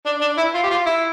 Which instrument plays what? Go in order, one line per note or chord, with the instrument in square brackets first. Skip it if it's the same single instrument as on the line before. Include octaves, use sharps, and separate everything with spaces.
[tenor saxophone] D4
D4
E4
F4
G4
F4
E4